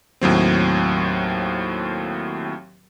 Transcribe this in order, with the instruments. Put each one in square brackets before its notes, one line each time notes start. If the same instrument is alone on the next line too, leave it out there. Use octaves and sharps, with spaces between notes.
[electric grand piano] D#2 A2 F#3 C4